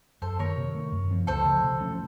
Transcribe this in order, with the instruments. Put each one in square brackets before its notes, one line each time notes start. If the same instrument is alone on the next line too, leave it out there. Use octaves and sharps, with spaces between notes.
[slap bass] F#2 [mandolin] A4 C5
[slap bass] D#3 A#3 [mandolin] A#4 C#5
[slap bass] C3
D#3 A3
F#2
F3 C4
[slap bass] C#2 [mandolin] A4 C5
[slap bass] C#3 F3 A3
C3
F3 A3 C#4